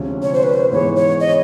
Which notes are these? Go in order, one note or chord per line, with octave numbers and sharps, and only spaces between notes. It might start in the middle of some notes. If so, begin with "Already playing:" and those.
Already playing: D2 C3 F3 G#3 C#4
C#5
C5
B4
C5
G#2 E3 G#3 B3 C#5
C#5
D#5